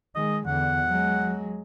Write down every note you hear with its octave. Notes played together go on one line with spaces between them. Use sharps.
D#3 G#3 D#5
E2 D3 F#5
F#3 G#3